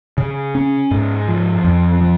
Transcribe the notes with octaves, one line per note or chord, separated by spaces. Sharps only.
C#3
C#4
G#2
F3
F2
F3